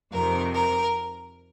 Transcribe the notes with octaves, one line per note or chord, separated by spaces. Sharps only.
F2 C3 D#3 A#4
A#4